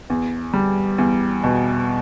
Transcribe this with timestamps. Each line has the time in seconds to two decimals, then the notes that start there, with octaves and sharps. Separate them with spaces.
0.10 E2
0.53 G3
0.98 E2
1.44 B2